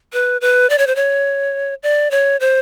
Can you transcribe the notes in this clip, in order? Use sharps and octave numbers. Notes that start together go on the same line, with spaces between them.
B4
B4
D5
C#5
C5
C#5
D5
C#5
C5